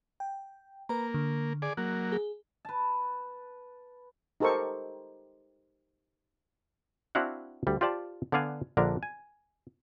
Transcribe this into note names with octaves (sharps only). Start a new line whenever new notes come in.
G5
A#3 B4 A#5
D3
G#4 D5
F#3 A#3 F#6
G#4
B4 A5
D#4 G4 A4 A#4 C5 C#6
C4 D4 E4 F#4 F5 F#5
D2 G3
F4 G4 C5 D5 G5 A5
D3 B3 D5 F5 G#5
A#1 D3 D4 A#4
G#5